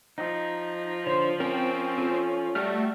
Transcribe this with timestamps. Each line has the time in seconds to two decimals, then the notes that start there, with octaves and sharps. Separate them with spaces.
0.18 F3 D#4
1.07 D3 C5 C#5
1.40 C4 C#4 A#4 G5
1.98 F4 A4
2.55 G3 A3 F#4 G4 F6